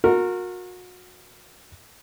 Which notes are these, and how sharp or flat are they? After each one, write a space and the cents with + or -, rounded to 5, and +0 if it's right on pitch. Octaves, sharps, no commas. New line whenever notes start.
F#4 -35 A#4 -10